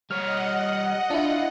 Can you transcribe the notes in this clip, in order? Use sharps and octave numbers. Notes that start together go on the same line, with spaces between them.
G3 C#5 D#5 F#5 F6
D4 E4 F4